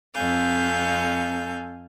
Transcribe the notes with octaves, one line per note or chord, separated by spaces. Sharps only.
F2 C4 A4 F5 G#5 G6